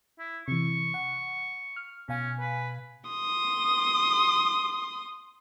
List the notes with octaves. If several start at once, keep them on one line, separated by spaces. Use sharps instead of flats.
E4
C3 E3 C#6
F#5
F6
B2 C#4 F5 G#5
B4
C6 D#6